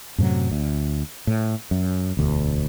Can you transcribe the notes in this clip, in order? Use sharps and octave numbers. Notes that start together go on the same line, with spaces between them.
F#2 A2 C3 F#3
D2
A2
F#2
E1 D2